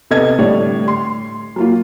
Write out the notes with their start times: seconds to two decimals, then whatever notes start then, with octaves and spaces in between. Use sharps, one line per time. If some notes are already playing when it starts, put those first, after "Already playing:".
0.11 C3 B3 G4 A4 D#5 G#6
0.38 A2 D3 G3 C#5 D5
0.88 C6
1.56 F#3 A#3 F4